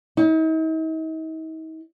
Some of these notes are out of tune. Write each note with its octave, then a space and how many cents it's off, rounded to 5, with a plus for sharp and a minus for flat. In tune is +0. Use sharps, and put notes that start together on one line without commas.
D#4 +45